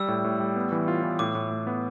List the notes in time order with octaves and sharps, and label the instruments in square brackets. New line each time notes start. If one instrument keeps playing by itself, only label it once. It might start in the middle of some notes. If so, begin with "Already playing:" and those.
Already playing: [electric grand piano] G3 [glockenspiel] E6
[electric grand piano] A2
A2
G3
B3
E3
F4
E3
[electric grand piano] A2 [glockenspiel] D6
[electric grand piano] A2
A2
B3